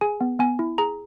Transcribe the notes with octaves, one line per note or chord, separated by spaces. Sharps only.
G#4 G#5
B3
B3 G#5
E4
G#4 A#5